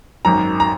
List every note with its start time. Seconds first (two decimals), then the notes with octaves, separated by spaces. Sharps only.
0.25 G#1 F#2 D#3 A#5
0.60 A#5